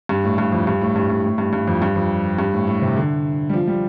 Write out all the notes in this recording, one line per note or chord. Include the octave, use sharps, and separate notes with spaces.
G2
A2
G2
F2
G2
A2
G2
G2
A2
G2
G2
F2
G2
F2
G2
A2
A2
C3
D3
G3
F3
G3